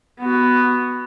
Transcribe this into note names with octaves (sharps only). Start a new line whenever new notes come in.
B3 F#4